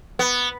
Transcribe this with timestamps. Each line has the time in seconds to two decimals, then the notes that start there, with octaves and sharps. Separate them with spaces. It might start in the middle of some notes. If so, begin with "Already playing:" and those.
0.19 B3